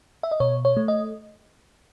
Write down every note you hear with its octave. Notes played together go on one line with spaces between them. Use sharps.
E5
D#5
B2 C#5
C#5
A3
D#5